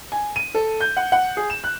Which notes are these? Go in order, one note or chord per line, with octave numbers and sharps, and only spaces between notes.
G#5
D#7
A4
G6
F#5
F#5
G#4
E7
F#6